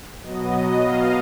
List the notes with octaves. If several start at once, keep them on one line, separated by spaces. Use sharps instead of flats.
B2 F#3 B3 D#5
D#5
F5